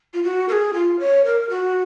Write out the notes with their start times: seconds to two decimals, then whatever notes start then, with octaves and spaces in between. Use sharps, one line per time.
0.14 F4
0.23 F#4
0.49 A#4
0.52 G#4
0.74 F4
0.99 C#5
1.25 A#4
1.50 F#4